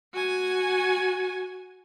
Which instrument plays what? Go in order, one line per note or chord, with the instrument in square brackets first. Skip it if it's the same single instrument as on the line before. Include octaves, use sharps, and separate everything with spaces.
[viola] F#4 G#5